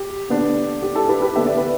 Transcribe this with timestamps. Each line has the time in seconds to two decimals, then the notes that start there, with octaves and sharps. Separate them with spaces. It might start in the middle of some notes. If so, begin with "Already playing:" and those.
Already playing: G4
0.29 D3 B3 D4
0.82 G4
0.95 E4 A4
1.09 G4 B4
1.22 G4 B4
1.36 D3 B3 D4 E5
1.47 D5
1.57 B4